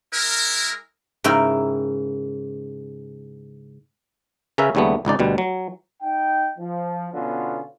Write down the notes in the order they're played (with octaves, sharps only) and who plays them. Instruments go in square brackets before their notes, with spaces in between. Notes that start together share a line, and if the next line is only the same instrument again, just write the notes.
[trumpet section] G#3 E4 A#4
[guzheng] G#2 C#3 E4 A#4 G5
[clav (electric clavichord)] C#3 C#4 A#4 B4 E5
D#2 C#3 G3 A3 B3
G#1 C#2 D#4 D5
D2 B2 G3
F#3
[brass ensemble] D#4 G5
F3
B2 D3 B3 C#4 F4